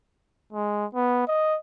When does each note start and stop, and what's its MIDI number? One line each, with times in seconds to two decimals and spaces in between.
0.53 0.86 56
0.95 1.23 59
1.28 1.57 75